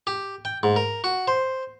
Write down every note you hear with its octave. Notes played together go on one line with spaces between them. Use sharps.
G4
G5
G#2
A#4
F#4
C5